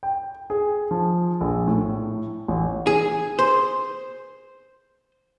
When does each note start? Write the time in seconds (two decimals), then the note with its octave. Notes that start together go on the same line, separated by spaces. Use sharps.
0.03 G5
0.50 G#4
0.91 F3
1.41 A#1
1.67 A2
2.48 A1
2.87 G#4
3.39 C5